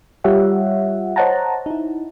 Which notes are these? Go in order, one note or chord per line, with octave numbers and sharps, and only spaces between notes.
G3 F4 G4 C#5 E5 F#5
C5 C#5 D#5 F#5 A5 A#5
D#4 E4